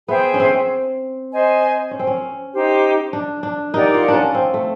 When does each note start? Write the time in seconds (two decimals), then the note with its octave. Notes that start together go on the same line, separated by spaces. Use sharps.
0.08 B3 G#4 C5 E5 G5
0.34 C#4
0.40 C4
1.31 C5 D#5 G#5
1.91 C#4
1.99 C4
2.07 C#4
2.52 D#4 G4 C5
3.13 D4
3.43 D4
3.73 D#4 G4 A#4 D5 F#5
3.94 F4
4.08 D4
4.14 C#4
4.35 C4
4.54 A3